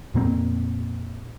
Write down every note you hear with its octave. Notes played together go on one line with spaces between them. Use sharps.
F2 A#2 A#3 C4